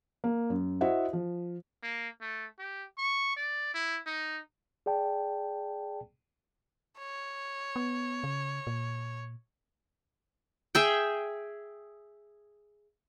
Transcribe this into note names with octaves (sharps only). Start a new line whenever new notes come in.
A#3
F#2
E4 F#4 C5 D#5 E5 F#5
F3
A#3
A3
G4
C#6
D5
E4
D#4
G#4 D5 G5 A5
C#5
B3
C#3
A#2
G#4 E5 G5